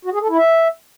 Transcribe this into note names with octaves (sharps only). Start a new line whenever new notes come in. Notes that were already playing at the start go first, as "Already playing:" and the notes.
F#4
G#4
A4
E4
E5